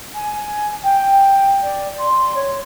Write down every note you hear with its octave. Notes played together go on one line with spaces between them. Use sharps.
G#5
G5
D5
C6
C#5